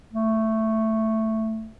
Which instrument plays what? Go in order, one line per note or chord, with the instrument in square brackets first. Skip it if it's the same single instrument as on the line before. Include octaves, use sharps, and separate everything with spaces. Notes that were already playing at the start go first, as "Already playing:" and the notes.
[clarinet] A3